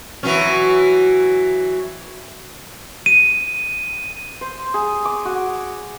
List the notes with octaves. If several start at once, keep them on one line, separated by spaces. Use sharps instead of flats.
E3 F#3 C#4
D#7
C5
G#4
D6
F#4